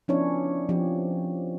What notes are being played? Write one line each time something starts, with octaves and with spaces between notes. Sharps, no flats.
F3 B3 C#4 D4 E4 C#5
F3 C4 G4